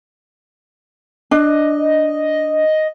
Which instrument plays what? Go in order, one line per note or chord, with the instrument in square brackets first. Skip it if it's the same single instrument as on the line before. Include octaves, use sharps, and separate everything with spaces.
[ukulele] D4 [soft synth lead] D#5